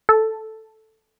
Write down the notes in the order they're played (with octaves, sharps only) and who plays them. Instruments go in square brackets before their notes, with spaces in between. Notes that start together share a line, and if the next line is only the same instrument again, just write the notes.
[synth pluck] A4